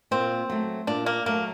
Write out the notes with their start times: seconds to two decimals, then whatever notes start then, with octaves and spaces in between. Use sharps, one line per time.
0.11 A#2 C4
0.50 F#3 A3
0.87 A#2 D4
1.06 A#3
1.26 F#3 A3 A#3